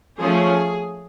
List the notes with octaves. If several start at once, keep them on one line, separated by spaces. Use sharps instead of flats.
F3 A3 C#4 G#4